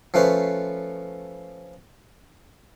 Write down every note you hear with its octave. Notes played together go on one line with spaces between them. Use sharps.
F3 A3 C#4 B4 C5